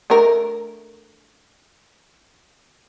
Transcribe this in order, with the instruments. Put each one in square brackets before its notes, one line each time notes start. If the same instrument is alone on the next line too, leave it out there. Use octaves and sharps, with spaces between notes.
[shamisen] A3 D4 A#4